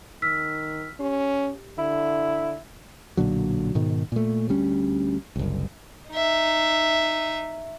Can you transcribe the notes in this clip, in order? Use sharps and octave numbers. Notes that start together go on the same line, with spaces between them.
D#3 E6 F6 B6
C#4 G4
D3 E4
B1 A#2 D3 F#3
G#2 B2 D#3
A#2 A3
D2 G3 C#4
F#1 C2
D#4 E5